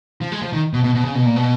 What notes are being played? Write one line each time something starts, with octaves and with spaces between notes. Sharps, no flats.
F3
G#3
F3
D#3
B2
B2
B2
C#3
B2
A#2
B2